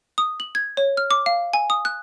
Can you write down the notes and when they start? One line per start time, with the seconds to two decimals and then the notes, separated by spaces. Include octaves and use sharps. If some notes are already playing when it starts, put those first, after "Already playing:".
0.18 D#6
0.40 F#7
0.55 G#6
0.77 C#5
0.97 F6
1.11 D6
1.26 F5
1.53 G#5
1.70 D#6
1.85 F#6